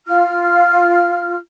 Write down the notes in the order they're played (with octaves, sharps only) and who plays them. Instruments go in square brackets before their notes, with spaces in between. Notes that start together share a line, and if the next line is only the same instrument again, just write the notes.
[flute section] F4 F6